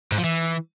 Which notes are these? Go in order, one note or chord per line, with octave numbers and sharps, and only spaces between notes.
G#2
F3
E3